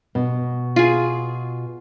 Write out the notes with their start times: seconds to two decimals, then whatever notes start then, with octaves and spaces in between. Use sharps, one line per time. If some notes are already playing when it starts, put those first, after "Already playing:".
0.15 B2
0.76 F4 G#4